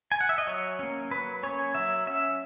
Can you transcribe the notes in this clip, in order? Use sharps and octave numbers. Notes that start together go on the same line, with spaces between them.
G#5
F#5
E5
D#5
F#3 C#5
A#3 C#4
F#3 B4
A#3 C#4 C#5
F#3 E5
C#4 E5